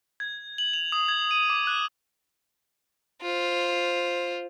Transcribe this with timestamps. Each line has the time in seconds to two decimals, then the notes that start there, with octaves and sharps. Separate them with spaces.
0.20 G#6
0.58 F#7
0.73 F7
0.92 D#6
1.08 G#6
1.31 D#7
1.50 D6
1.67 F#6
3.22 F4 C5